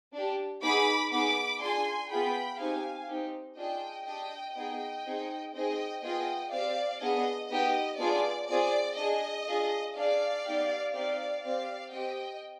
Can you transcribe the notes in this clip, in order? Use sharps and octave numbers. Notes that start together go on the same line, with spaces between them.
D4 G4
B3 D#4 G#4 B5 D6
B3 D#4 G#4 B5 D6
D4 F4 G#4 G#5 C6
B3 F4 G#4 G5 B5
C4 D#4 G4 F5 G#5
C4 D#4 G4
D4 F4 G#4 D#5 G5
D4 G4 D#5 G5
B3 D#4 G#4 D#5 G5
C4 D#4 G#4
C4 D#4 G#4 D#5 G5
B3 F4 G#4 D#5 G5
C4 G4 D5 F5
B3 D4 G#4 D#5
B3 D#4 G4 D#5
B3 D4 F4 G#4 D5
C4 F4 G#4 D5
D4 G#4 D#5
D4 F4 G#4
D4 G#4 D5 F5
B3 D#4 G4
C4 D#4 G4 D5 F5
C4 G4 D5 F5
C4 G4 D#5 G5